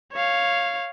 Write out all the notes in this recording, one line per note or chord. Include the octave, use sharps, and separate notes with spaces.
C#5 F5